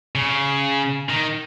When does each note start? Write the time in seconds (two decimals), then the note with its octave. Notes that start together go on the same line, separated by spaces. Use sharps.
0.15 C#3
1.10 D#3